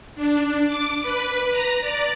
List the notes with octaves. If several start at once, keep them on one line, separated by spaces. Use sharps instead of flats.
D4
D6
B4
A#5
D5